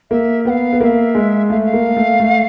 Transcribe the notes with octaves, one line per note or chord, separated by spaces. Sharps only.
A#3 E5
B3 F5 G5
B3
A#3 E5 F5
G#3
A3 F5
F5
A#3
A3
A3